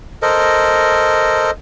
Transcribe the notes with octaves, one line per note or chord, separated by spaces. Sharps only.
A4 A#4 C5 D#5